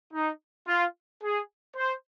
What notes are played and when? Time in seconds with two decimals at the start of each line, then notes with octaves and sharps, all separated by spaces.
0.13 D#4
0.68 F4
1.22 G#4
1.77 C5